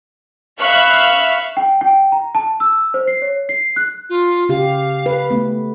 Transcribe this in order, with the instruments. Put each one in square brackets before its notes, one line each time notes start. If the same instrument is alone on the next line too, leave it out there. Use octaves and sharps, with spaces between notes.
[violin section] E5 F5 B5 C#6 F6 F#6
[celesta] G5
G5
A#5
A5
E6
C5
C7
C#5
C7
F#6
[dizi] F4
[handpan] C#3 G4 [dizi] F5
[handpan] B4
A3 B3